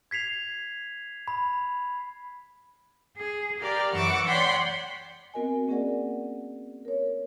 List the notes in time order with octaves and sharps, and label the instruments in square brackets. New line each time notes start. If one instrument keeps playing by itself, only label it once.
[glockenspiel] G#6 B6 C7 F7
B5
[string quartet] G#4
G4 A#4 D5 F5
F#2 E3 F#5 C#6 D6 E6
C#5 D5 F#5 G5 B5 C6
[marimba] B3 C4 F#4 A#4 D#5 G#5
A#3 C#4 G#4 A#4 D5 F#5
A#4 C#5